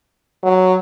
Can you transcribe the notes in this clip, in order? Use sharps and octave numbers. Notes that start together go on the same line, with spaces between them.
F#3